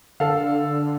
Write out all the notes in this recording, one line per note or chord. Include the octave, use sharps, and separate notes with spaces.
D3 A4 F5